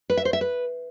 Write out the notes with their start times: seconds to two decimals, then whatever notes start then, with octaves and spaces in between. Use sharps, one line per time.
0.10 B4
0.17 E5
0.25 C5
0.33 E5
0.41 B4